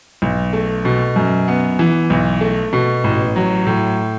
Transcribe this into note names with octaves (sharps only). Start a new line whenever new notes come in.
B1
A3
B2
F#2
B3
E3
B1
A3
B2
A1
F#3
A2